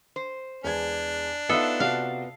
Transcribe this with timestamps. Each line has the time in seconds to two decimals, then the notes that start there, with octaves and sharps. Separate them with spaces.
0.16 C5
0.64 E2 G#3 D4 G#6
1.49 B3 D#4 F4 A4 E5
1.80 C3 F#4 D5 F5